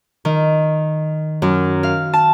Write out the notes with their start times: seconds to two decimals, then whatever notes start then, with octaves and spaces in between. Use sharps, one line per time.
0.25 D#3
1.42 F#2
1.83 F5
2.13 A5